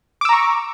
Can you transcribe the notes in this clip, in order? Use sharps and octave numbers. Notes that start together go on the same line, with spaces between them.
A#5 C#6 D6 E6